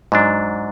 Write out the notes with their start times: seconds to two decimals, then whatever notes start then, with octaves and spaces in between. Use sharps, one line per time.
0.12 G#2 F#3 D4